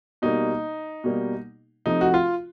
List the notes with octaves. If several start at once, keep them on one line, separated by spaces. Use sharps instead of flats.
B2 G3 A#3 D#4
B2 G3 A#3
C3 F3 A3 D#4
F#4
F4